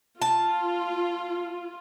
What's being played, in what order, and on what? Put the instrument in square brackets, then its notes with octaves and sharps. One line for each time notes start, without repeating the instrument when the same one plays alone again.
[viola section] F4 [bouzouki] A5